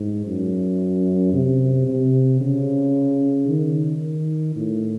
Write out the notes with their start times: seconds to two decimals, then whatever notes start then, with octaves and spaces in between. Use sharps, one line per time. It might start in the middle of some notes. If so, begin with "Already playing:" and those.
Already playing: G#2
0.26 F#2
1.34 C3
1.86 C3
2.41 C#3
3.48 D#3
4.56 A2